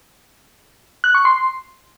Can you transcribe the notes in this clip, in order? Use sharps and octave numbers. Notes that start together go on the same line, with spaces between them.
F#6
C#6
C6